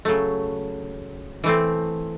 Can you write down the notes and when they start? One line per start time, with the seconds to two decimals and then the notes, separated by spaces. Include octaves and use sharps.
0.05 C#3 F#3 A3
1.44 E3 A3 C4